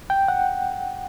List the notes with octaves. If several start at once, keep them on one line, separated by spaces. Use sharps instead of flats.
G5
F#5